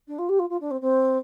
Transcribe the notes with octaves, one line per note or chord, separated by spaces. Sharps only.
D4
F4
G4
F4
F4
D4
C4
C4